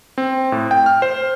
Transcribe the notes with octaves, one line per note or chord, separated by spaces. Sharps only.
C4
A2
G5
F6
C5